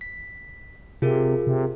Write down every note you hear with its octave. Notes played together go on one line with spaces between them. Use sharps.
B6
C3 F4 G#4 A#4
C3